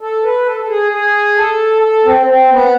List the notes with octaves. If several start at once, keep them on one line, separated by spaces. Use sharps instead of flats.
A4
B4
A4
A4
G#4
G#4
A4
A4
C4
C4
B3